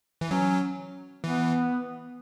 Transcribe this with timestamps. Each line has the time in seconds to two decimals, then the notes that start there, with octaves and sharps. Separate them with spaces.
0.21 E3
0.30 F#3 C#4
1.24 E3 B3